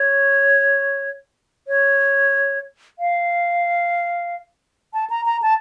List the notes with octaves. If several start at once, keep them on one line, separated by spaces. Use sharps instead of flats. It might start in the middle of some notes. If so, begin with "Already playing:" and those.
Already playing: C#5
C#5
F5
A5
A#5
A#5
A5